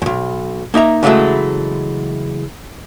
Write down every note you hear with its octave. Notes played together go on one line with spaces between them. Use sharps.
B1 E2
A#3 D#4 E5 A#5
C#3 E3 F#3 G#3 A3